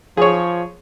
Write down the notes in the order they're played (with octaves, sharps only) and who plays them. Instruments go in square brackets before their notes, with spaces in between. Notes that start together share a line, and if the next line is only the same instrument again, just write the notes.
[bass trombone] F3 [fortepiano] G#4 C#5